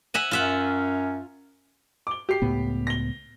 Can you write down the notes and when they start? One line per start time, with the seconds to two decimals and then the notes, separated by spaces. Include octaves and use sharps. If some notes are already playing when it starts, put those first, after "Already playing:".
0.14 E5 F#5 G#5
0.31 F#2 C#4 F4 E5 F#5
2.07 D6 G7
2.29 G4 C7
2.42 C#2 A2 B3
2.87 A#6 G7